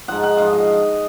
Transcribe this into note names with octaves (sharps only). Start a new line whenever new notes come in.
G#2 F3 F#5
F#5
G#2 F3 F5
D#5